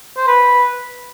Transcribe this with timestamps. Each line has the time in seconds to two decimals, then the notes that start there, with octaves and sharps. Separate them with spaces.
0.17 C5
0.28 B4